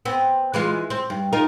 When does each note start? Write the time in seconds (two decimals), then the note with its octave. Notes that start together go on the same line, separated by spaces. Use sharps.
0.05 B3 C4
0.54 E3 G#3 F4
0.90 C4
1.10 G2
1.33 D#4 F4 A#4